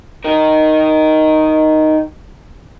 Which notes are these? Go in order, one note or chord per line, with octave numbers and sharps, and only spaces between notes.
D#4 A#4